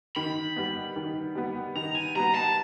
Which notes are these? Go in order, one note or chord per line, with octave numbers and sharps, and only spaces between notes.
D#3 B5
G3 B3
D#3
G3 B3
D#3 A#5
G#5
G3 B3 A#5
A5